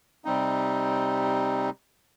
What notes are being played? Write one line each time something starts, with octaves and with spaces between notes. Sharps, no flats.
C3 G3 C4 D#4